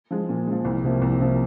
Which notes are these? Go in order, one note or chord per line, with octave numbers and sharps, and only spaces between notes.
F3 G#3
A#2
F3 G#3
C2
C3 F3 A#3
C2
C3 F3 A#3